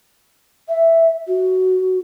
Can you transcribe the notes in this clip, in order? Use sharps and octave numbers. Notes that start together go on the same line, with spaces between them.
E5
F#4